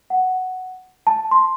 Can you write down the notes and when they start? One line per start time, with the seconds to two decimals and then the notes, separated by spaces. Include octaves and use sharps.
0.10 F#5
1.07 A5
1.31 C6